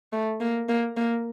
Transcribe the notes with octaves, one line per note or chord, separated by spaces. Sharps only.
A3
A#3
A#3
A#3